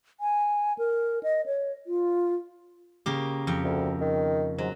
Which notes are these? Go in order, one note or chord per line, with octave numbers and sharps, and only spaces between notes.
G#5
A#4
D#5
C#5
F4
C#3 A#3 G4
F2 G5
D2
D#3
G#2 F#3